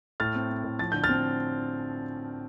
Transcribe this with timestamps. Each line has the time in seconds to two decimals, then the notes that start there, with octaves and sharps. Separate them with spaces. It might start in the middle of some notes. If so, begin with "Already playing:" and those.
0.20 A2 F6 A6
0.35 C4
0.50 C4
0.64 A2
0.79 F3 A6
0.92 D3 G6
1.04 F6 A6
1.09 C4